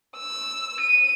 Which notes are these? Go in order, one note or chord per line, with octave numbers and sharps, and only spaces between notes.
E6
D#7